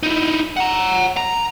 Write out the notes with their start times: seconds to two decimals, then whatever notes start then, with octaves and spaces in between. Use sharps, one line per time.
0.03 D#4 E4
0.57 F#5 A#5
1.17 A#5